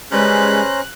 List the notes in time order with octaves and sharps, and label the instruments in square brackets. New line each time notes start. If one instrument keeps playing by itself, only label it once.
[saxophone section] C#3 G3 B4 [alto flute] G#3 [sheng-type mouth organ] C#4 C5 A#5 [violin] F#6